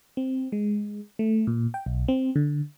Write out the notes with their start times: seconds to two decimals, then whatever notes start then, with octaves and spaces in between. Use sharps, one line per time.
0.17 C4
0.52 G#3
1.19 A3
1.47 A#2
1.74 G5
1.86 B1
2.08 C4
2.36 D3